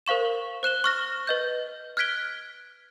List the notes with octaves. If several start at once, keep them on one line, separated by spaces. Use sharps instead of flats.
A#4 C5 F5 C#6 E7
C5 F#6 E7 G7
C#6 F6 A#6
B4 D#5 G6
F6 F#6 G#6 B6 D7 G7